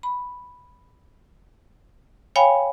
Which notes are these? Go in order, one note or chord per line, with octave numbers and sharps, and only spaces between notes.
B5
C#5 F5 G5 G#5 B5